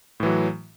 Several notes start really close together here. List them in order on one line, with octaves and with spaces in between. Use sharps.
A2 E3 F#3